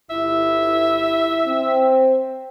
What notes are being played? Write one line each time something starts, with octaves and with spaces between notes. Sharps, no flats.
G1 E4 E5
C4